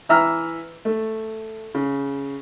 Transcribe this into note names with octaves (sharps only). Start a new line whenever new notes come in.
E3 E5 A#5 E6 F6
A3
C#3